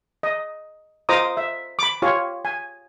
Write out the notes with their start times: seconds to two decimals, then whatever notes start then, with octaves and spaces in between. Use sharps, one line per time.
0.23 D#5
1.09 F4 C5 D#5 A#5 D6 D#6
1.37 E5
1.79 B5 D6
2.02 F4 G4 C#5
2.45 G#5